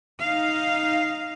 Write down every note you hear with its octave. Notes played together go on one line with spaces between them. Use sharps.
D#4 F5